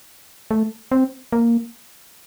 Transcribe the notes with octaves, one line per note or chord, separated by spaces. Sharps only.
A3
C4
A#3